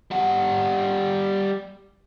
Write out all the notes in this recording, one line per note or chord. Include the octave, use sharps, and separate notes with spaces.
G3 F#5